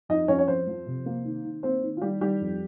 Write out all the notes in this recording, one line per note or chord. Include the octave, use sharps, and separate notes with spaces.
F2 D#4 D#5
F2 C#4 C#5
C#5
F2 C4 C5
F3
C3
A#3
D#3
D#3
A#3 C4 C5
D#3
F4
D#3 G3 G4
D#3 G3 G4
F2